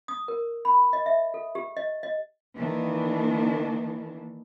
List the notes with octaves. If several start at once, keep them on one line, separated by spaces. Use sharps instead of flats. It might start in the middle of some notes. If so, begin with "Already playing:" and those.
D#6
A#4
B5
D#5
E5
A4
G4
D#5
D#5
D#3 E3 A#3 D4